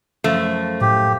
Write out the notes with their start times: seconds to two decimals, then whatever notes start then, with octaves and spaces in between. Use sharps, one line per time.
0.24 F#2 F3 A3
0.81 A2 G4